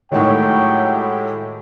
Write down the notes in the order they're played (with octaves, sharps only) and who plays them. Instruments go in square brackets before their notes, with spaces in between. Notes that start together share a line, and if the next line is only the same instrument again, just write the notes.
[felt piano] A2 D#3 [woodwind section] F#3 [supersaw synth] G#3 E4 G4 [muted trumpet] G5